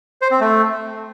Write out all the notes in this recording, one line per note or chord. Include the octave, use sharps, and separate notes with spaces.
C5
C4
A3